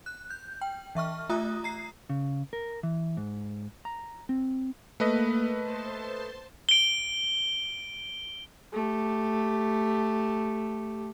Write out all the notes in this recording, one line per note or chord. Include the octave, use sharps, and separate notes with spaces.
F#6
G6
G5
E3 E5 C#6 F6
A3 F4 E5 A#5 D#6 F#6
A#5 C7
C#3
A#4
E3
G#2
A#5
C4
A3 A#3 B4 D#5
C5 A5 C6
D7 G7
A3 G4